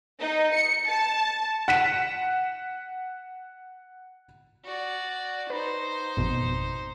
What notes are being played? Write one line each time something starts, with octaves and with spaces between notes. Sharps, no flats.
D#4
C#7
A5
F#5 B6 E7
F#4 D5
D#4 B4 C5
G#1 F2 B2